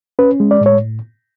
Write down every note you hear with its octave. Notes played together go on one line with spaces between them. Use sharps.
C#4 B4
G#3
D5
A2
C#5